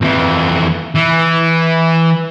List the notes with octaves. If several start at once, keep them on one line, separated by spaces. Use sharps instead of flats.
F2 E3
E3